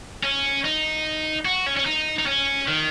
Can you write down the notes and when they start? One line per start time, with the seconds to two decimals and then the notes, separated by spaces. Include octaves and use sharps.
0.23 C#4
0.64 D#4
1.45 F#4
1.66 C#4
1.77 C#4
1.86 D#4
2.19 D#4
2.26 C#4
2.68 D#3